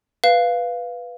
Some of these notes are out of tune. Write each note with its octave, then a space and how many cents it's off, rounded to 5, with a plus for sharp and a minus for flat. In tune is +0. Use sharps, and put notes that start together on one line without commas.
B4 +0 F5 -5